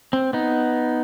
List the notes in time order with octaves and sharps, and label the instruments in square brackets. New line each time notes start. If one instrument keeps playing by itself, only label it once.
[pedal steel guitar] C4
B3 D#4